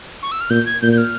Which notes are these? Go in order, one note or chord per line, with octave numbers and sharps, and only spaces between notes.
C#6
E6
F6
A#2 G6
G#6
A#2 G6
G6
F6